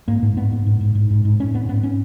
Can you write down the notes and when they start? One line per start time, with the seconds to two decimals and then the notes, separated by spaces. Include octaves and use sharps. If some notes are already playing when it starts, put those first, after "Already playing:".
0.08 G#2 A#3
0.23 G#2
0.37 G#2 B3
0.52 G#2
0.66 G#2
0.81 G#2
0.95 G#2
1.10 G#2
1.25 G#2
1.40 G#2 C#4
1.54 G#2 B3
1.69 G#2 B3
1.83 C#4